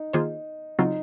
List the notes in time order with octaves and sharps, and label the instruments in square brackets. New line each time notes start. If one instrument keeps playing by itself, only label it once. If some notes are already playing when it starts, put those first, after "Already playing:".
Already playing: [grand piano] D#4
[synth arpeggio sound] D#3 A#3 F4 G#4 C5
[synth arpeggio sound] C#3 F#3 C4 F4 [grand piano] D#4